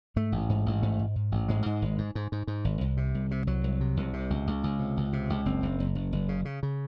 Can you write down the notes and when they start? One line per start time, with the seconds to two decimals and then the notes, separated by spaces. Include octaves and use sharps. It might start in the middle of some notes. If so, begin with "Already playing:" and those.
0.16 G#2 A3
0.32 A1
0.49 G#2
0.66 A1
0.82 G#2 A3
0.99 G#2
1.16 G#2
1.32 A1
1.48 G#2 G#3
1.66 G#2
1.82 G#1
1.98 G#2
2.15 G#2
2.32 G#2
2.47 G#2
2.65 G#1
2.81 C2
2.97 C3
3.15 C2
3.31 C3
3.47 C2 F#3
3.64 C2
3.81 C3
3.97 C2
4.13 C3
4.30 C#2
4.47 C#2
4.64 C#2
4.79 C3
4.97 C#2
5.13 C3
5.30 C#2
5.46 F#1 C4
5.63 F#1
5.80 F#1
5.95 F#1
6.12 F#1
6.29 C#3
6.45 C#3
6.63 C#3